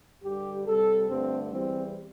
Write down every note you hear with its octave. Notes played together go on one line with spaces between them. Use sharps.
G2 D3 G3 G4
C3 G3 A4
G2 D3 A3 C4
E2 E3 G3 C4